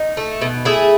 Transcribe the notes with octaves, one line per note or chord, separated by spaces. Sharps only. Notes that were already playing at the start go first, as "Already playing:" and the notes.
Already playing: D#4
A3
B2
A3 E4 G#4